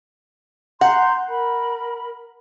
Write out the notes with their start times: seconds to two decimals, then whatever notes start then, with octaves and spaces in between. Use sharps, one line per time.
0.81 F#5 A#5 C6 G6
1.29 A#4 B5